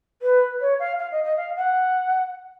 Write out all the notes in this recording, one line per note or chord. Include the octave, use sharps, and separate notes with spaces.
B4
C#5
F5
F5
D#5
D#5
F5
F#5